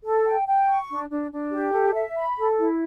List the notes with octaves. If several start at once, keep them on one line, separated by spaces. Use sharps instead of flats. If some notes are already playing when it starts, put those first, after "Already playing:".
A4
G5
G5
C#6
D4
D4
D4
G4
A4
E5
B5
A4
E4